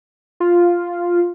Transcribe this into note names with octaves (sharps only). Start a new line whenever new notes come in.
F4